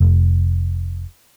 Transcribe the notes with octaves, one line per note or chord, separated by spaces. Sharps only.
F1